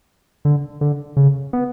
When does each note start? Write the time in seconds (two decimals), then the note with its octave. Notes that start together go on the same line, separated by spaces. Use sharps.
0.45 D3
0.81 D3
1.17 C#3
1.53 B3